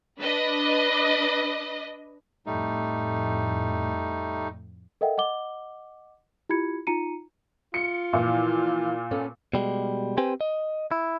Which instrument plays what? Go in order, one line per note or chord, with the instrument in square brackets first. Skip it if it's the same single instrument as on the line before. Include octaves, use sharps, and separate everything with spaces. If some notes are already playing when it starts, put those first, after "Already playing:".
[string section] D4 B4 D#5
[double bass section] F2 A2 [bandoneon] G3 A3 D#4
[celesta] A4 A#4 D#5 E5 F#5 G5
D#5 F#5 D6 G7
E4 F4 G4 B5 G#6 C#7
D#4 F4 A#5 C#7 D#7
[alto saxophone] F4 [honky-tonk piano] C#7
[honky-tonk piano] A#2 [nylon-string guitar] E3 F3
[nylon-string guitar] B3 C#4 A4
[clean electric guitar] B2 G3 G#3
C4 G4 B4 C5 G5 G#5
D#5
E4